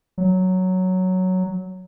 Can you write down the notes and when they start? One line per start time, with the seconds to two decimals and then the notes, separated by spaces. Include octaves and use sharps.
0.18 F#3